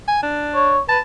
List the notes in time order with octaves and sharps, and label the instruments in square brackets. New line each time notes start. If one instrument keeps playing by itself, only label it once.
[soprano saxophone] G#5
D4
[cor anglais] C#5
[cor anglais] B4 [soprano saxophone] A5